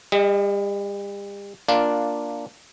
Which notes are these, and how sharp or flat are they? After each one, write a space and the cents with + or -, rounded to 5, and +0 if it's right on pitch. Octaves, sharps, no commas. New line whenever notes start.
G3 +40 D#5 +0
A#3 +0 D4 +0 F4 -5